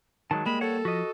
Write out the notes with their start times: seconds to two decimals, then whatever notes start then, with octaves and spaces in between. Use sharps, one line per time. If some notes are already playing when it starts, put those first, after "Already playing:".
0.31 D#3 F#3 G#3 A5
0.46 G3 G#3 A#3 B5
0.61 A4 C#5 F#5
0.85 F3 F#4 D#5